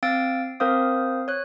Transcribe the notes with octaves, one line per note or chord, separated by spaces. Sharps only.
C4 F5 E6 A6 D7
C4 A#4 C5 F5 D#6
C#5 F#6